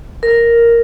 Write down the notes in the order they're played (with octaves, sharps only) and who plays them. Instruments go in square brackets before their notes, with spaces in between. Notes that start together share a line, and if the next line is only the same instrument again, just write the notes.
[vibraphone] A#4